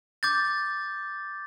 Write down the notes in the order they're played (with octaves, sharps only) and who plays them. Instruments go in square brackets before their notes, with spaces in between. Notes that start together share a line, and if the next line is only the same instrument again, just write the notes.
[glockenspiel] D6 G6 A6